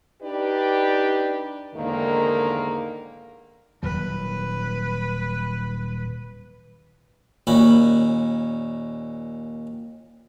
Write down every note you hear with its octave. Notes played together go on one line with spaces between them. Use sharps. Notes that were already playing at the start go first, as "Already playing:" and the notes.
D4 D#4 G4 B4 D5
E2 G#2 D3 D#3 A#3
D#1 F#3 B4
D#2 A#2 C#4 B5